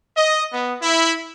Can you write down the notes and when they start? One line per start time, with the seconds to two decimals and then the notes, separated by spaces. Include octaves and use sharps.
0.15 D#5
0.52 B3
0.82 E4